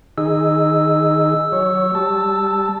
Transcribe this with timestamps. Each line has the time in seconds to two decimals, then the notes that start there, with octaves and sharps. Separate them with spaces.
0.18 D#3 D#4 G#4 E6
1.52 F#3 C#5
1.95 G3 A5